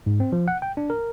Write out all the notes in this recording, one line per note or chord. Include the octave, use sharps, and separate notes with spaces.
G#2
C4
F3
F#5
G5
D4
A#4